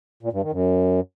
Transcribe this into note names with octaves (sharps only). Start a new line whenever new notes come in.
A#2
G2
D#3
F#2